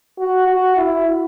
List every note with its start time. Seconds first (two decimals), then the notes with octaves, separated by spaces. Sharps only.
0.19 F#4
0.47 F#4
0.77 E4